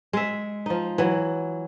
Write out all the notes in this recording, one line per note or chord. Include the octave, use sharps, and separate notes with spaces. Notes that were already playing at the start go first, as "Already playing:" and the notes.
G#3 E5
F3 D#4
E3 F#3